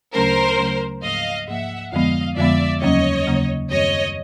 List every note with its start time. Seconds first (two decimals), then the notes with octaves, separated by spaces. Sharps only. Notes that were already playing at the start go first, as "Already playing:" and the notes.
0.14 D2 C#3 F#3 A3 C#4 A#4 C5
0.58 D2 C#3 F#3 A3 C#4
1.03 G#2 F3 A#3 D#5 F5
1.48 G#2 F3 A#3 E5 F#5
1.92 F2 D3 F3 G#3 B3 D#5 F5
2.37 F2 D3 F3 G#3 B3 D5 E5
2.82 D#2 C#3 F#3 A#3 C#4 C#5 D#5
3.27 D#2 C#3 F#3 A#3 C#4
3.71 F#2 D#3 G3 C4 C#5 D#5